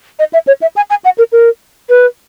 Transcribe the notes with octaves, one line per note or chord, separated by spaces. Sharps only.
D#5
E5
C#5
E5
G#5
G#5
F#5
A#4
A#4
B4